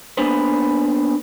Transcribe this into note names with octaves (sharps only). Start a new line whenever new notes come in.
A#3 B3 D4 G#4 B4 C5